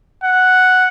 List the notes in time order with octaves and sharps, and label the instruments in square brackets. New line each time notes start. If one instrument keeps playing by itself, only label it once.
[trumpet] F#5